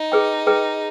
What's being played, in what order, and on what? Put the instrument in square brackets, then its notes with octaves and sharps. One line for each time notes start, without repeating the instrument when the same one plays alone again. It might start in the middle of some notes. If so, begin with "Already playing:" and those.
Already playing: [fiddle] D#4
[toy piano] G#4 B4 G5
G#4 B4 G5